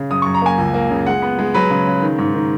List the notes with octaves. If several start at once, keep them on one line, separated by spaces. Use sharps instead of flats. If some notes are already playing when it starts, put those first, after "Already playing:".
Already playing: C#3
F#2 D#6
C#6
F#2
A#5
A#3 G#5
C#2
A#3
C#3
G#3 F#5
B3
G#3
F#3 B4
C#3
C#3
D#3
G#2
D#3